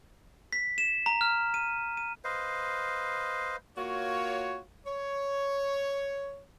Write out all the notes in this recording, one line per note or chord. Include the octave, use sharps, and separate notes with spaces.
B6
E7
A#5
F6
D#7
D#7
B4 C5 D#5 F5
A#3 F4 F#4 C#5
C#5